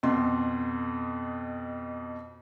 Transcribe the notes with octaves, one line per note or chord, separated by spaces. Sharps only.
F2 B2 C6